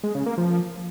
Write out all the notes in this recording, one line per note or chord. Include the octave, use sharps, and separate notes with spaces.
G#3
C#3
A#3
F3